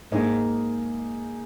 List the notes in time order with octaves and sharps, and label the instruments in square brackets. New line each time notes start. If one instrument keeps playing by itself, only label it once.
[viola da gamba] G#2 G#3 [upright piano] A#3 D#4 G#4